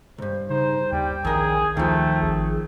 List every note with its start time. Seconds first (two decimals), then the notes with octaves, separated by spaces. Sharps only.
0.18 C2 G2 C5
0.50 C#3 D#4 C5
0.92 D#2 G3 G5
1.25 A#1 D#2 G#4 A#4
1.77 D2 D#3 F3 A3 G5
2.22 G#1 G#4